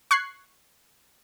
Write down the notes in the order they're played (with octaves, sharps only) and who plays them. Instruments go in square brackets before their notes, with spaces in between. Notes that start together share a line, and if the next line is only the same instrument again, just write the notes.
[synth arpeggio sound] C#6 F#6 G#6 C7